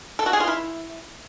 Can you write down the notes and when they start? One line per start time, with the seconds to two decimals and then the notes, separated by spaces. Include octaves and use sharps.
0.19 A4
0.26 F#4
0.33 G#4
0.40 F4
0.47 E4